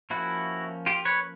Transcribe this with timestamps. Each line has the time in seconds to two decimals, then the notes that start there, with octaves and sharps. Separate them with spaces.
0.10 F3 A#3 C#4 E4 F#4
0.86 F4 G4
1.05 B4 C#5